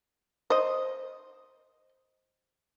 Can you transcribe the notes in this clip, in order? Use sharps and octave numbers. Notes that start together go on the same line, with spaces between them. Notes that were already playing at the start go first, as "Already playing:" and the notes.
C5 D#5